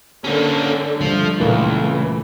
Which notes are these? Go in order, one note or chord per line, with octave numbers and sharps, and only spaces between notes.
D3 A#3 C#4
D3 F3 G3 A3
C#2 A#2 E3 F4 A#4